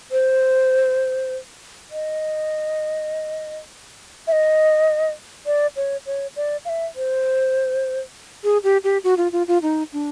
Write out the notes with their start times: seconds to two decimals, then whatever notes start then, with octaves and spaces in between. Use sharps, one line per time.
0.12 C5
1.91 D#5
4.27 E5
4.32 D#5
5.46 D5
5.76 C#5
6.06 C#5
6.36 D5
6.65 F5
6.69 E5
6.96 C5
8.44 G#4
8.64 G4
8.84 G4
9.04 F#4
9.17 F4
9.32 F4
9.48 F4
9.62 D#4
9.93 D4